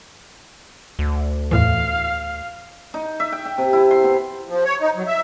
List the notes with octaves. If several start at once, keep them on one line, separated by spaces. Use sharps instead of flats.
D2
E2 A2 E3 F5
D#4
E5
G5
G5
C3
E4
C6
B3
F3
C#5
D#4
F#3
E5